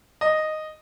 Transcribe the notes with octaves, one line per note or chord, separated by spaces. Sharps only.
D#5